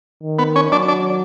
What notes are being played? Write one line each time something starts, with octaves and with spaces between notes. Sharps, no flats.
D#3
B3
C#4
F#3 D4
D4